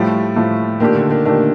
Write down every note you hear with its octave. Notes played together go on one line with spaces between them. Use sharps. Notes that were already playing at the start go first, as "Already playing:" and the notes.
Already playing: A2 F3 G3 A3
A2 F3 A3
A#2 D#3 A3 D4 G4
D3
D#3
A#2 D#3 A3 D4 G4